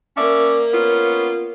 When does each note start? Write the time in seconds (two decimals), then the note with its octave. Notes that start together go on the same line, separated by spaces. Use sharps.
0.17 A#3 C#4 D5 E5
0.74 B3 C#4 F4